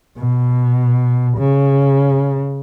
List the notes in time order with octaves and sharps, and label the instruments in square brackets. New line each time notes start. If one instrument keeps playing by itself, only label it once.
[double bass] B2
C#3